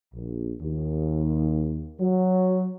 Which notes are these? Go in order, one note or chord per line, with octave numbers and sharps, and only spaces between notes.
A#1
D#2
F#3